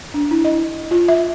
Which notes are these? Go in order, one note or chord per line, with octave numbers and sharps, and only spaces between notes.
D4
E4
D#5
F4
E5